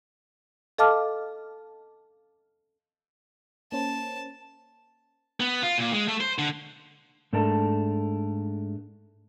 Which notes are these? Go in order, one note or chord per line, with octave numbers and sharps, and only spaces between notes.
A4 D#5 F5 A5 D6 F6
A#3 C#4 C5 A5
B3
F4
A#2
G#3
A3
C5
D3
G#2 A3 D4 A4 A#4 A5